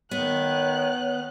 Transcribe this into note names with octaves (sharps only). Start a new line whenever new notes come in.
D#3 B3 C#5 F#6